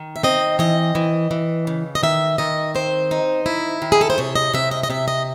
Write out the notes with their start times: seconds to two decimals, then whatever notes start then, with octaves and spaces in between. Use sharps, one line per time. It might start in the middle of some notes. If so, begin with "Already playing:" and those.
Already playing: D#3
0.16 E5
0.23 C4 D#5
0.59 E3 D#5
0.95 E3
1.31 E3
1.67 C#3
1.95 D#5
2.03 D#3 E5
2.38 D#3 D#5
2.75 C4 C5
3.11 D#4
3.46 E4
3.82 D#3
3.92 G#4
4.01 A4
4.10 C5
4.18 C3 C#5
4.35 D#5
4.53 C3 E5
4.71 D#5
4.83 D#5
4.90 C3 E5
5.08 D#5